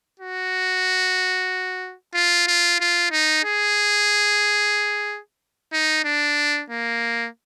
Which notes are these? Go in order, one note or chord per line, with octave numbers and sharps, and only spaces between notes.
F#4
F4
F4
F4
D#4
G#4
D#4
D4
A#3